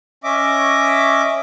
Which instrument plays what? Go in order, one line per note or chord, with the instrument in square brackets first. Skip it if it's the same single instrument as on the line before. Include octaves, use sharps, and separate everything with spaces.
[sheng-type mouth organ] C#4 D#5 E5 D6